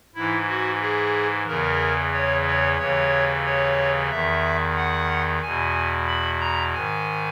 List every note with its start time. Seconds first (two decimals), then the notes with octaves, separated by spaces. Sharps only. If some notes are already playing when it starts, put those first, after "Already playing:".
0.15 G#2 E3 E4
0.48 F#4
0.81 G#4
1.47 E2 C#3 E3 A#4
2.13 C#5
2.46 C#5
2.79 D#2 C#3 E3 C#5
3.45 C#5
4.10 E2 D#3 E5
4.76 F#5
5.42 E2 B2 G#5
6.08 B5
6.40 A#5
6.73 G#2 D#3 G#5